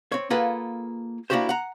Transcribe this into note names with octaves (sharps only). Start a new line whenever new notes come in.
C4 C#5
A#3 F4 G#4 A4 B4 F#5
A#3 D4 E4 F#4 G4 C5
F#5 A#5